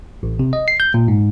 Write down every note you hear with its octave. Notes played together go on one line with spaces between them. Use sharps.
A1
C3
D#5
C7
G6
A#2
G#2